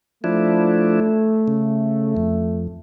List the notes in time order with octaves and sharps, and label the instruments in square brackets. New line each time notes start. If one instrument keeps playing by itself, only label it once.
[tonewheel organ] F3 D4 E4 [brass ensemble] A3
[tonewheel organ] C#3
F2